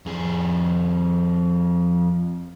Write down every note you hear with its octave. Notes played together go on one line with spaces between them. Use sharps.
F2 G#4